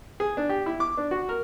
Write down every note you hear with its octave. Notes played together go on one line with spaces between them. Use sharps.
G#4
D4
G4
E4
D6
D4
F#4
A#4